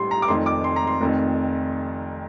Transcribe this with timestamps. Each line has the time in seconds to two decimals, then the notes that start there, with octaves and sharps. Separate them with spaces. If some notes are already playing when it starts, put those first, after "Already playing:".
Already playing: A1 A2 G3 C6
0.11 A#5
0.22 D6
0.28 F1 F2 D#3 C6
0.46 D6
0.64 C6
0.76 A#5
0.87 C6
1.01 F1 F2 D#3